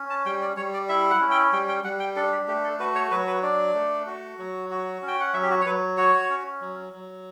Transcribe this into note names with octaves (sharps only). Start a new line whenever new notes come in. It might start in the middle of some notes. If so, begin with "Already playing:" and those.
Already playing: C#4
A5
G3 G5
D5
G3 C#5
D5
E4 E5
F#5
C#4
G5
G3 G5
G5
G3 F#5
G5
D4 A4
G4
A3 G4
A4
F#4 B4
C#5
F#3 B4
B4
D4 D5
A3
F#4
F#3
F#4
C#4
G5
F#5
F#3 E5
G4
F#4
C#5
F#3 B4
F#4 C#5
C#4
F#3
F#3